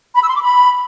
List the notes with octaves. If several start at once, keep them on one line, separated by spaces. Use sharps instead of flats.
B5
E6
C6
D6
B5